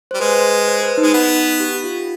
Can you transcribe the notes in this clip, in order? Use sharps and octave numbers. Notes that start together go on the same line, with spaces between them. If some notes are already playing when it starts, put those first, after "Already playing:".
G3 C5
G#3 B4
C5
B4
D#4
G#3
B3
G4
G4
F4